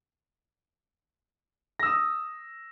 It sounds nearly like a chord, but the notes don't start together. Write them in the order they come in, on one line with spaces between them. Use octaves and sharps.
A#6 E6 D#6